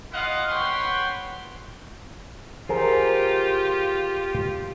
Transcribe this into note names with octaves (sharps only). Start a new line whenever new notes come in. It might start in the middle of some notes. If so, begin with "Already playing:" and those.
E4 F4 D#5 F5 F#5
B4 C#5 F#5 G5 B5 C6
F4 G4 G#4 A#4 C5